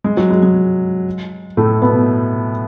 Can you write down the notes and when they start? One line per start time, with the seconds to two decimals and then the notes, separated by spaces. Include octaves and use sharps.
0.04 G#3
0.17 F#3
0.30 G#3
0.43 G#3
1.57 A2 A3
1.82 B2 B3